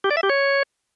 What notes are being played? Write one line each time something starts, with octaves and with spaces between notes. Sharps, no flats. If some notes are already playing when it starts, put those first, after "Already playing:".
G4
D5
E5
G4
C#5